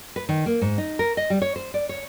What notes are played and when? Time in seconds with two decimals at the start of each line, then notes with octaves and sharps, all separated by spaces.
0.16 B4
0.29 D#3
0.46 A#3
0.61 G#2
0.78 D#4
0.99 A#4
1.17 D#5
1.30 G3
1.42 C#5
1.56 C5
1.74 D5
1.89 C#5